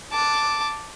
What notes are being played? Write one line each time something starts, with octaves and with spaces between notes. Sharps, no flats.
A5 D6